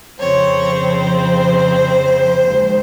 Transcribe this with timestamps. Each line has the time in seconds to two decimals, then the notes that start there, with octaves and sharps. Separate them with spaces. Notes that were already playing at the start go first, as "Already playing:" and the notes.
0.19 F2 C#3 F3 C4 C#5
0.75 C5
2.47 D#2 C#3 G#3